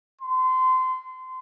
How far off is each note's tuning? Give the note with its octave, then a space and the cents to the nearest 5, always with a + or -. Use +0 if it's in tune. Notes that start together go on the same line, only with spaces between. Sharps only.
C6 -25